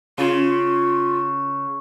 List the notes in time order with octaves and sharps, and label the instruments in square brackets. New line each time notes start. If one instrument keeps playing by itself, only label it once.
[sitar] C#3 [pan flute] F4